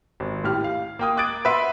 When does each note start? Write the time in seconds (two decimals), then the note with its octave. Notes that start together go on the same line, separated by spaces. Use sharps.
0.20 G#1
0.44 A2 G4 F6
0.64 F5
0.99 A#3 G5 D#6
1.17 D6 D#6 F#6 G#6 A6 D7
1.45 B4 E5 F#5 C6